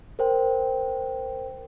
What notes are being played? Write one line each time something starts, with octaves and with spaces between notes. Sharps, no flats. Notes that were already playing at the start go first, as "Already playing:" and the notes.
A#4 C5 G5